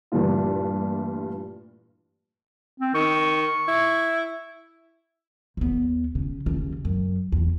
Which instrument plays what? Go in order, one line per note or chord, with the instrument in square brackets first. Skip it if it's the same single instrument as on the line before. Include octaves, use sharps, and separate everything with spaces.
[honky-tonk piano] G2 A#2 E3 G3 A3 F4
[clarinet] C4
[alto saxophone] D#3 [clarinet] C#6
[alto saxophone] E4
[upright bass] D#2 B3
C#3
D#2 C#3
F#2
E2